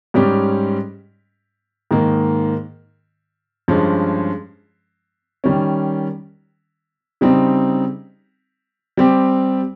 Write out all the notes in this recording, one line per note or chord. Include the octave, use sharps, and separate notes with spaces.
G#2 G3 C#4 G4
G#2 D#3 A#3
G2 F3 G#3 C#4
D#3 G3 C#4
C#3 G3 C4 D#4
G3 C4 G4